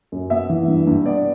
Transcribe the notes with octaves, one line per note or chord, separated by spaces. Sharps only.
F#2
B3 E5
E3
G2
G2
B3 D5